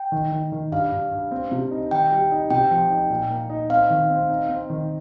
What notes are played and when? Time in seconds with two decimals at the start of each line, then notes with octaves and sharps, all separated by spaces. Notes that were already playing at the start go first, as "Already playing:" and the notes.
Already playing: G5
0.12 D#3
0.32 D#3
0.52 D#3
0.72 G2 F5
0.92 G2
1.11 G2
1.31 C4
1.51 C3
1.71 D#4
1.91 D#3 G5
2.11 G3
2.31 D#4
2.50 C3 G5
2.71 F3
2.90 D#4
3.10 A#2
3.30 A#3
3.50 D#4
3.70 C4 F5
3.90 D#3
4.10 C4
4.29 D#4
4.49 C4
4.70 D#3